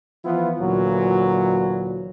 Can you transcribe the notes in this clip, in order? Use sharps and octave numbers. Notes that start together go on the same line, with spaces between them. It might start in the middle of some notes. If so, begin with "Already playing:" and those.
E3 F3 B3 E4 F4
D2 A#2 E3 F#3